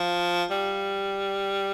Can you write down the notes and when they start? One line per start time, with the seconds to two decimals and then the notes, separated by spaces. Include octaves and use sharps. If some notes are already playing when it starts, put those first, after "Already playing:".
Already playing: F3
0.51 G3